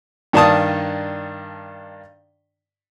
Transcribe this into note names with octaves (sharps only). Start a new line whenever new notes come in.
G2 D#3 D4 F5 A5 D#6